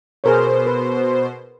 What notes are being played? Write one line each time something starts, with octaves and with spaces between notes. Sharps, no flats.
B2 G#4 A#4 C5 C#5
B4